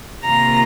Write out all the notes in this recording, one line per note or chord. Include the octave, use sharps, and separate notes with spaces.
C3 D#3 A#3 F4 A#5